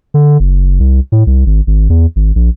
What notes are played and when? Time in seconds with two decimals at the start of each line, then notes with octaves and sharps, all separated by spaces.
0.14 D3
0.40 F#1
0.79 C2
1.12 A2
1.27 C2
1.46 G#1
1.67 G#1
1.90 E2
2.16 G#1
2.36 A#1